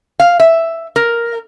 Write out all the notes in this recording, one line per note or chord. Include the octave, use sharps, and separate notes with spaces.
F5
E5
A#4